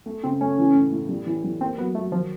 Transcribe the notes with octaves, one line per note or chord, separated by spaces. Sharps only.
A3
C#3 C4
A3 C#4
E3
A2
A2
G3
E3
G3
A#3 C4
F#3 B3
F#3 A3
D#3 F3